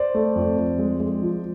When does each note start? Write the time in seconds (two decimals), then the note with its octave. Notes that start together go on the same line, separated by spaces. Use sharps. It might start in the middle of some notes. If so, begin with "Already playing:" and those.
Already playing: C5 D5
0.14 A3
0.35 F2
0.57 F2
0.79 G#3
1.00 G#3
1.22 F3